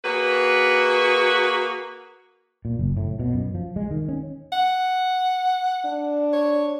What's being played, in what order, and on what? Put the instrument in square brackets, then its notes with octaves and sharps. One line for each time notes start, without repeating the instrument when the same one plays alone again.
[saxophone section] A#3 F#4 G#4 B4
[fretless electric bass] A#2
F#1
A2
B2
F#2
F3
G#3
D#3
C#4
[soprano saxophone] F#5
[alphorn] D4
[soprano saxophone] C#5